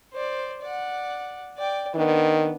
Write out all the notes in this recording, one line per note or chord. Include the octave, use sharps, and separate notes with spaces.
C5 D5
D5 F#5
D5 G5
D#3 B3 D4